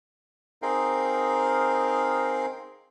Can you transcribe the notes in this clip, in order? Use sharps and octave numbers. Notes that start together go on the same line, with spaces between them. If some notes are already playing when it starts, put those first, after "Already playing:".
C4 D#4 G#4 A#4 F5 G5